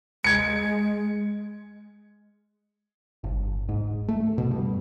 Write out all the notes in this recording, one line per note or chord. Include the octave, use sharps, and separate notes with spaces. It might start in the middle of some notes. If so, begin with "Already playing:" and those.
G#3 G#6 C#7
G1
G#2
A3
B2
G2